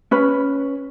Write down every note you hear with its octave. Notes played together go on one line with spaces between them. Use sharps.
C#4 B4